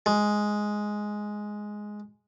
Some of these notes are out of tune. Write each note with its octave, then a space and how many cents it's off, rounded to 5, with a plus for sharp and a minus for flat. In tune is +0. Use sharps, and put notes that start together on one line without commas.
G#3 +5